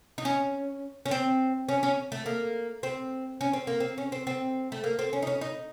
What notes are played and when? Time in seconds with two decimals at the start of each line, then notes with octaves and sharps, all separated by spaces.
0.18 D#4
0.25 C#4
1.06 C#4
1.11 C4
1.69 C#4
1.83 C#4
2.12 A3
2.26 A#3
2.83 C4
3.41 C#4
3.53 C4
3.67 A#3
3.80 C4
3.98 C#4
4.12 C4
4.27 C4
4.72 A3
4.84 A#3
4.99 C4
5.13 C#4
5.22 D#4
5.27 C#4
5.41 D#4